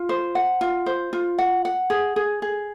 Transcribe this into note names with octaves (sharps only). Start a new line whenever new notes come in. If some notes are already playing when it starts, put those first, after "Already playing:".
Already playing: F4
C5
F#5
F4
C5
F4
F#5
F#5
G#4
G#4
G#4